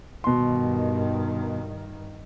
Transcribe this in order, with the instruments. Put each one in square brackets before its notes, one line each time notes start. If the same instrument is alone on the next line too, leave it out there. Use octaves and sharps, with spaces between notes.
[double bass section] G2 D#3 [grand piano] B2 C6